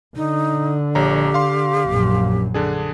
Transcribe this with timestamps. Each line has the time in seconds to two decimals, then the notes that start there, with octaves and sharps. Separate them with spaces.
0.16 D3 D#4
0.95 A#1 G4 C#5 A#5
1.34 F5 C6
1.88 A#1 F#2
2.54 D3 D4 G#4